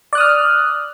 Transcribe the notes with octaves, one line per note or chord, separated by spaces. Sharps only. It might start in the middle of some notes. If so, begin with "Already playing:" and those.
D5 D#6 F6 F#6